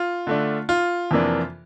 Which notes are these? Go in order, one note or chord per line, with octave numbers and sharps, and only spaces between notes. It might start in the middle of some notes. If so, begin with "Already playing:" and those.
Already playing: F4
D3 A3 D4
F4
F2 C3 E3 A#3 D4